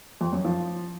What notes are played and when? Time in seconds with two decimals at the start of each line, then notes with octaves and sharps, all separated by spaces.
0.21 F2
0.33 F#2
0.44 F3